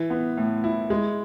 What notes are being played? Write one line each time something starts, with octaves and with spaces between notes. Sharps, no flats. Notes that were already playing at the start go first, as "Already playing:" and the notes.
Already playing: E3
B3
A2
E4
G#3